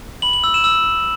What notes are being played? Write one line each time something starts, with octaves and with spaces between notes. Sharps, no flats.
B5 F#7
F#7
E6
E7
E6